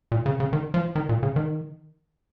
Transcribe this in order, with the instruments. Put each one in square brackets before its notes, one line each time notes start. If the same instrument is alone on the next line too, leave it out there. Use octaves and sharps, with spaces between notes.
[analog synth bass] A#2
C#3
C#3
D#3
F3
D#3
A#2
C#3
D#3